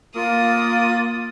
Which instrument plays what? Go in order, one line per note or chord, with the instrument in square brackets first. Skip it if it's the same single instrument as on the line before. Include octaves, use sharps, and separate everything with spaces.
[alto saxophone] A#3 [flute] F4 [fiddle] D#6